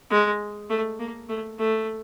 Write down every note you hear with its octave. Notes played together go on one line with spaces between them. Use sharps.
G#3
A3
A#3
A3
A3